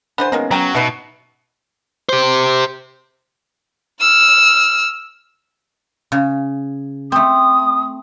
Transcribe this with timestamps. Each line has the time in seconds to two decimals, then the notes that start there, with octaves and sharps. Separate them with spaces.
0.18 D3 E3 B4 C5
0.32 D#3 G#3 A#3 B3 C#4
0.51 C#3 F#3 G5 A#5
0.75 B2 B3 D#4 B4 E5
2.09 G4 C5
4.01 E6 F6
6.12 C#3
7.12 A3 C4 D#6